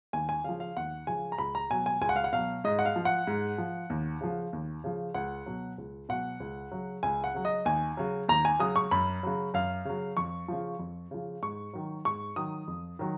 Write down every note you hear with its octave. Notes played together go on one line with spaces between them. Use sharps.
D#2 G#5
G#5
C#3 F3 F5
F5
D#2 F#5
C#3 F3 G#5
A#5
C#2 B5
A#5
B2 F#3 G#5
G#5
C#2 G#5
F#5
F5
F#5
B2 F#3 F5
G#2 D#5
F#5
F5
F3
F#5
G#2
F3
D#2
C#3 F3
D#2
C#3 F3
C#2 F#5
B2 F#3
C#2
B2 F#3 F#5
C#2
C#3 F#3
C#2 G#5
F#5
C#3 F#3
D#5
D#2 G#5
C#3 F#3
D#2 A#5
G#5
C#3 F#3 D#6
C#6
F#2 B5
C#3 F#3
F#2 F5
C#3 F#3
F2 C#6
C#3 F3
F2
C#3 F3
G#2 C#6
D#3 F#3
G#2 C#6
D#3 F#3 D#6
F2
D#3 F#3